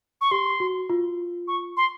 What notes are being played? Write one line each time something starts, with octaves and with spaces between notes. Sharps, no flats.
C#6
G4 C6
F#4
F4
C#6
C6